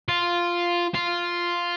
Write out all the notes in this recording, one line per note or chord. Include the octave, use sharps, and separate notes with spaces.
F4
F4